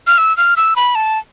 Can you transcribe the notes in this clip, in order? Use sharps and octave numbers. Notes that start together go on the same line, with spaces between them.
F6
E6
F6
E6
B5
A5